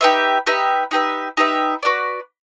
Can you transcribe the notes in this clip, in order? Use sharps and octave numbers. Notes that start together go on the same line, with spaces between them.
D#4 G4 B4 E5
D#4 G4 B4 E5
D#4 G4 B4 E5
D#4 G4 B4 E5
F#4 B4 D5